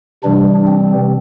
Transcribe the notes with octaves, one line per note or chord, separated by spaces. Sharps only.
C3 E3 G3 D4
C4